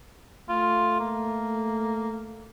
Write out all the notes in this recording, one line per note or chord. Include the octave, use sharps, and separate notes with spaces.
A3 F4
A#3